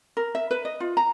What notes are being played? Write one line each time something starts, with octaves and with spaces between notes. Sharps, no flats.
A#4
E5
B4
D#5
F4
A#5